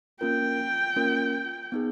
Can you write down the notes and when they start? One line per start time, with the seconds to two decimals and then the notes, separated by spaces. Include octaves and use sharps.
0.21 A#3 C#4 F4 A#4 G5
0.96 A#3 C#4 F4 A#4
1.72 B3 D#4 G#4